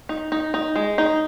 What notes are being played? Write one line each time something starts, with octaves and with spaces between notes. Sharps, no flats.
D#4
D#4
D#4
G#3
D#4